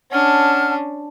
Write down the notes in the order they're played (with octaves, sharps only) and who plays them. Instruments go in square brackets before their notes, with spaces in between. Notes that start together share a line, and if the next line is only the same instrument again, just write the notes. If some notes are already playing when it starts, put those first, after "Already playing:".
[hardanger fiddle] C#4 D4 [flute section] F#5 A5 F6